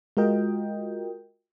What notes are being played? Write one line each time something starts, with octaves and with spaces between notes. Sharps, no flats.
G#3 F4 F#4 A#4 D#5 G5